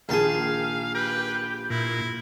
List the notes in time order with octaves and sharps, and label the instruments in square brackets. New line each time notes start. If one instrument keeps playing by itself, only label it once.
[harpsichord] A#1 G5 A5 [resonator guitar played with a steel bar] D#3 G#4 [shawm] F5
[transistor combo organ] G4 [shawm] B4
[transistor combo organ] A#2 [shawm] E4